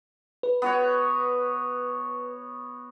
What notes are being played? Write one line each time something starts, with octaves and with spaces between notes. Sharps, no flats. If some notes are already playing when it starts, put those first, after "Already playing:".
B4
B3 F#4 C#5